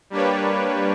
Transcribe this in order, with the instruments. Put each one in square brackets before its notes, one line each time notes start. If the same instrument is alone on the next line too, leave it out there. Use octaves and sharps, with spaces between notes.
[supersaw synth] G3 A#3 D4 G4 B4 C#5